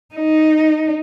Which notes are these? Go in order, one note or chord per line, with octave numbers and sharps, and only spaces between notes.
D#4